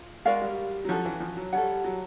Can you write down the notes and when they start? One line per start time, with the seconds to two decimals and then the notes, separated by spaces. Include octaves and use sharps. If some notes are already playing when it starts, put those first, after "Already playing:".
Already playing: F4
0.25 G#3 F#4 A#4 D5 F5
0.41 G3
0.85 F#3
0.88 F3 C#4 F#4 A4
1.05 E3
1.20 F3
1.37 F#3
1.53 G3 A4 C#5 F#5
1.84 F#3